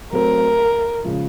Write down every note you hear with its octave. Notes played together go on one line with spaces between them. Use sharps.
F#3 A3 C4 A#4
C#3 F3 G#3